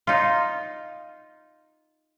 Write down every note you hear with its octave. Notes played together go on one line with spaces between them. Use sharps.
D#4 F4